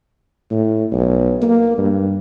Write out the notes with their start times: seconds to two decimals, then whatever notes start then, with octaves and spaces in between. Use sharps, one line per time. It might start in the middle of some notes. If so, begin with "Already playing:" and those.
0.51 A2
0.92 B1
1.42 A#3
1.78 G2